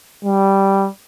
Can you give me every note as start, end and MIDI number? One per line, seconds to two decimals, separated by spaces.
0.25 0.88 55